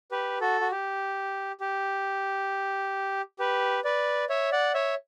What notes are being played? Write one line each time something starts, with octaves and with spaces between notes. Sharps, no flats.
G4 B4
F#4 A4
F#4
G4
G4
G4 B4
B4 D5
C#5 E5
D5 F#5
C#5 E5